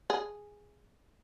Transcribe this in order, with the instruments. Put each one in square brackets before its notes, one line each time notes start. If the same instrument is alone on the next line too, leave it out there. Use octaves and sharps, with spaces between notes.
[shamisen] G#4